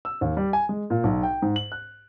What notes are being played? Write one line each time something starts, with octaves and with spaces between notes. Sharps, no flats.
E6
D#2
G3
G#5
G#3
A#2
B1
G5
G#2
F#7
F#6